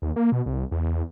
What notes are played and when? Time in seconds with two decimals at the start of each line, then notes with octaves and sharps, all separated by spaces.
0.02 D#2
0.16 A#3
0.32 B2
0.46 C2
0.71 E2